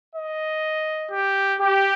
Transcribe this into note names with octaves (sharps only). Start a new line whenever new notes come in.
D#5
G4
G4